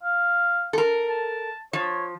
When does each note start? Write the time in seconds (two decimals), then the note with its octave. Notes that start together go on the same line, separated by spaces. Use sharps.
0.03 F5
0.73 A4 A#4
1.09 A5
1.73 F3 C#5